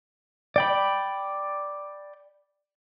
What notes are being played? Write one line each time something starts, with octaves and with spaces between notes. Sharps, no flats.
D5 G5 B5